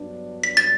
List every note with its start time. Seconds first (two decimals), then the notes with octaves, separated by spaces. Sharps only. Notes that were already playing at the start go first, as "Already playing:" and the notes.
Already playing: G2 F#3 B3 D4
0.44 B6
0.57 A6